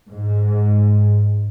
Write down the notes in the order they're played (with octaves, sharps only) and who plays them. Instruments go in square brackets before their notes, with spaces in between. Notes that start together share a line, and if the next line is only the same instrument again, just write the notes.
[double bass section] G#2